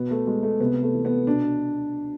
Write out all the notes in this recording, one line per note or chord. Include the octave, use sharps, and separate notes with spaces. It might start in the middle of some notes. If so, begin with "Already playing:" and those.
Already playing: B2 B3
A3
G#3
A3
C3 B3
A3
E3
B3
B2 D4